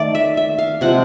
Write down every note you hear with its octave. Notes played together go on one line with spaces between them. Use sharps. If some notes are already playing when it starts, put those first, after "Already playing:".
Already playing: D#3 A3 D5
E5
E5
F5
C3 F3 G#3 F#5